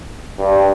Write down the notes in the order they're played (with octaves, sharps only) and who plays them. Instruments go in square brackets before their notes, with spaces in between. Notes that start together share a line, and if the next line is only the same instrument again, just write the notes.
[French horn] G2